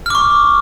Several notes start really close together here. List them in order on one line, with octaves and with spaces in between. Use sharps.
F6 D6 C#6